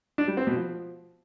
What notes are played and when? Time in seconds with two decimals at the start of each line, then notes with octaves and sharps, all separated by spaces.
0.18 D4
0.28 G3
0.37 C4
0.47 B2
0.56 F3